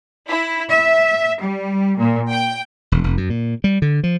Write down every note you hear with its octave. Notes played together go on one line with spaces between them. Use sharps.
E4
E5
G3
A#2
G5
E1
F1
F#2
A#2
G3
D3
F3